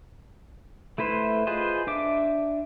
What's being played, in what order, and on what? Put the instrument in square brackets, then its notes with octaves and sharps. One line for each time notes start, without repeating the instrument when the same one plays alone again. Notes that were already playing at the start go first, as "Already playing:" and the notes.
[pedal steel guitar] A3 E4 B4 C5
F4 G#4 B4 C5 D#5
D4 E5 D6